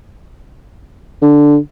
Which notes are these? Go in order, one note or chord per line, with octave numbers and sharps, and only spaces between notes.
D3